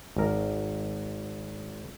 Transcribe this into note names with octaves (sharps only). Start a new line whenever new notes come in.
G#1 A#4